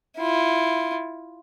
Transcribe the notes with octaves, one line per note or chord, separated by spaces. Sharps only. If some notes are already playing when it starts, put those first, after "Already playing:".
E4 F4